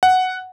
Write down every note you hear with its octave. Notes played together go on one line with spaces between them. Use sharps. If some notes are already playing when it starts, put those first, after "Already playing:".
F#5